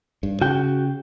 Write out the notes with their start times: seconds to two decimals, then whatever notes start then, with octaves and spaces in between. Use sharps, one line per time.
0.23 G2
0.41 C#3 F#4 G5